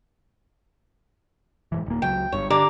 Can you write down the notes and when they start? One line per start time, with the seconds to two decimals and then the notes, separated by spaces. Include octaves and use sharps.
1.72 G#2 C3 E3
1.86 D#1 A#3
2.02 C#2 F#3 G5
2.32 G1 G2 C#5
2.50 D3 D4 G4 A#5 D6